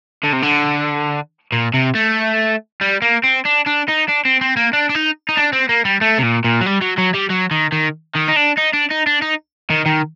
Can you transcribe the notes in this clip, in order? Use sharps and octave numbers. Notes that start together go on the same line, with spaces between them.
D3
C3
D3
A#2
C3
A3
G3
A#3
C4
D4
D4
D#4
D4
C4
C4
A#3
D4
D4
D#4
D#4
D4
C4
A#3
G3
A3
C3
A#2
A#2
F#3
G3
F#3
F#3
G3
F#3
D#3
D#3
D#3
D#4
D4
D#4
D4
D#4
D4
D#4
D#3
D#3